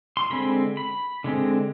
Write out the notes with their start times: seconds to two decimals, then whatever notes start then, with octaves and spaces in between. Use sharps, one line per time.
0.17 C6
0.30 D3 G#3 C4 B5
0.77 B5
1.24 D3 G#3 C4